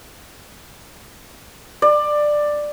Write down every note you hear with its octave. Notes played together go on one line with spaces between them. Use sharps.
D5